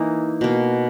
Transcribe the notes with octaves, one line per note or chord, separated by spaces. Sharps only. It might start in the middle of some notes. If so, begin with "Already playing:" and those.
Already playing: E3 A#3 D#4
B2 A#3